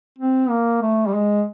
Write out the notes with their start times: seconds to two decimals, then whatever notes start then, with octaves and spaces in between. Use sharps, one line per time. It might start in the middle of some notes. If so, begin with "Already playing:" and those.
0.18 C4
0.49 A#3
0.82 A3
1.07 G3
1.13 G#3